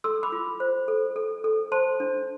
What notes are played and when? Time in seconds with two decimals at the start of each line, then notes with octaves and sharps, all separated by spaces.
0.04 A4 C6 E6
0.23 B5 D6
0.32 F4
0.60 C5
0.88 A4
1.16 A4
1.44 A4
1.72 C5 A5 C6
2.00 D4